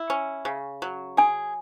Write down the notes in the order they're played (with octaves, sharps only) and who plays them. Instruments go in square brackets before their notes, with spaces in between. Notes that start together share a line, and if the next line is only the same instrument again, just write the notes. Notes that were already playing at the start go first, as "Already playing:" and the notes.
Already playing: [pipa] E4
C#4
C#3
F#3
[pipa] G#4 [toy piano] G#5